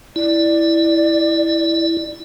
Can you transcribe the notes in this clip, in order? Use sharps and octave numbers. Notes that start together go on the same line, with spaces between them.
E4 D5